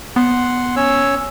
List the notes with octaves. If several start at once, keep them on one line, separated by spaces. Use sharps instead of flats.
B3 F#5 C6
C#4 C#5 E6